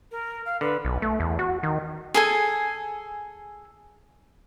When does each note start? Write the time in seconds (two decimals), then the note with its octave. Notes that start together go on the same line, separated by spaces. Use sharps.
0.11 A#4
0.45 F5
0.61 D3 B4
0.85 B1
1.02 A3
1.20 E2
1.39 F#4
1.63 D#3
2.14 G#4 A4 G#5